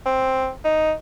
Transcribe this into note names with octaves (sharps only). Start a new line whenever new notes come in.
C4
D#4